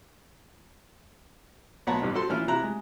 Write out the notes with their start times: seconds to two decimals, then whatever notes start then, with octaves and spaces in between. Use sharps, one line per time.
1.87 B1 B3 C#5 F#5 A5 A#5
2.01 A1 G2 C3 D#4
2.14 C4 F#4 A4 C6
2.29 A#1 E3 C#4 E4 F4 F6
2.48 C3 E4 A#5 F#6
2.63 G#3